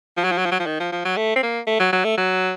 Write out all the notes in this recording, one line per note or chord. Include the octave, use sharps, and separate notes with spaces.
F3
F#3
F3
F#3
F3
F#3
F3
D#3
F3
F3
F#3
A3
C4
A#3
A3
F#3
F#3
A3
F#3